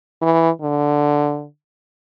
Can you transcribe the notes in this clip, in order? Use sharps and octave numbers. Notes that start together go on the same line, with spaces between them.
E3
D3